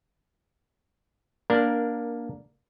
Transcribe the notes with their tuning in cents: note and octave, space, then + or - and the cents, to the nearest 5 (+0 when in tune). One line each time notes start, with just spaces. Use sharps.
A#3 +15 D4 +0 A#4 +0